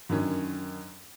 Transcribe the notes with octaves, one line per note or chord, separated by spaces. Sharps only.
F#2 D3 D#3 C#4